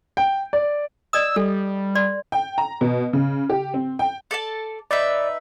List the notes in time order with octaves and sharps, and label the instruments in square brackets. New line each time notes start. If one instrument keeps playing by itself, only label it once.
[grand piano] G5
D5
[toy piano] D5 D#5 D#6 [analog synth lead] E6
[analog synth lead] G3 [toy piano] A4
[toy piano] D5 C6
[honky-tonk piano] G5
A#5
B2
C#3
G4
C4
G5
[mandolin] A4 D5 A5
[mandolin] D#4 B4 E5 [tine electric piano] D5